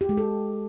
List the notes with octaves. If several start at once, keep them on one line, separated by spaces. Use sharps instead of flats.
G4
G#3
A4